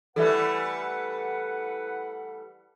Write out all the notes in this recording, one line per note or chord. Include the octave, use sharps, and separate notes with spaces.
E3 G3 A3 A4 B4 E5 F#5